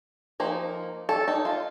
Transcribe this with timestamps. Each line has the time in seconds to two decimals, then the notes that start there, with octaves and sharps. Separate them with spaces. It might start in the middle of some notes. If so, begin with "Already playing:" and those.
0.40 F3 A#3 D#4
1.09 A4
1.28 D#4
1.45 F4